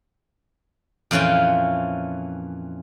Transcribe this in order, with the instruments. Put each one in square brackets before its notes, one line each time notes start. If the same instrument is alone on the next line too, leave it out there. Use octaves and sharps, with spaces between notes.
[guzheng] F2 A#2 E3 C#4 F4 G5